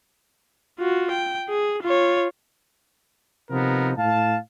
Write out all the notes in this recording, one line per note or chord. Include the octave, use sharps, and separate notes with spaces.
F4 F#4
G5
G#4
F4 C#5
C3 F3 B3 D#4 A#4
A2 F5 A5